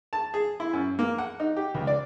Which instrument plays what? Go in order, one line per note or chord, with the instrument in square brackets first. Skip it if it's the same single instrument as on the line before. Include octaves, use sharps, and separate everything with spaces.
[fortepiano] A5
G#4
E4
F#2
A#3
F#5
D#4
G4
C#2
D5